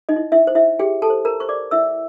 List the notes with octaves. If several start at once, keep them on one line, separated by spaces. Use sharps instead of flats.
D#4 D#5
E4
E4 E5
C5
E4 E5
G4 G#4 G5
A4 A5
C5
A#4 A#5
C5 C#6
D5 D6
E4 E5 E6